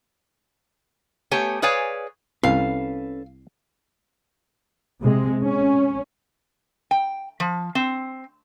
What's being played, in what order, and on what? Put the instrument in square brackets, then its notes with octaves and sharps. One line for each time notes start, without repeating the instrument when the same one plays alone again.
[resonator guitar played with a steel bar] A3 B3 G4 C#5 G#5
G#4 B4 C#5 D5 F5 G#5
[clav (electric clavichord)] C2 [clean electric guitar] C#4 A4 B4 [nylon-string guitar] F5
[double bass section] C3 G#3
C#4
[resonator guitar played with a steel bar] G5
F3
C4